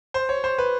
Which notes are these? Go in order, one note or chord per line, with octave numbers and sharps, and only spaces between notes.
C5
C#5
C5
B4